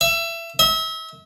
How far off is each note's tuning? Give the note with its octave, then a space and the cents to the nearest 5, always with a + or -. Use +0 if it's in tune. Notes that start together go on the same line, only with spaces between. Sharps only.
E5 +25
E5 -35